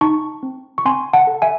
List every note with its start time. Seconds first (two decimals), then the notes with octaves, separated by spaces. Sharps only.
0.01 D#4 A5 C#6
0.43 C4
0.78 C#6
0.85 C4 G#5 C6
1.13 F#5 A5
1.27 A4
1.42 E5 G#5